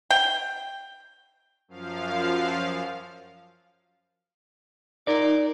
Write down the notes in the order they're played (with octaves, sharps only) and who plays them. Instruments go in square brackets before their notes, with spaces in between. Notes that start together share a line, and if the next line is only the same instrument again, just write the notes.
[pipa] G5
[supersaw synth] F#2 F3 F5
[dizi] D#4 [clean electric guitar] A#4 D5